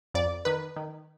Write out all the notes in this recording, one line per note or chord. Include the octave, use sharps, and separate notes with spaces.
F2 D5
D#3 B4
D#3